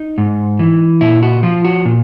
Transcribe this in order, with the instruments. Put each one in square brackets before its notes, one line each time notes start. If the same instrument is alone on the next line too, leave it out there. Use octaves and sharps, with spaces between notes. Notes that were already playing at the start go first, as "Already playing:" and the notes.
Already playing: [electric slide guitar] D#4
G#2
E3
A#2 E4
F#4
F3 F4
F#4
A#2